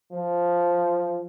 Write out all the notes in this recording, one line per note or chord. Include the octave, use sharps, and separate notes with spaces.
F3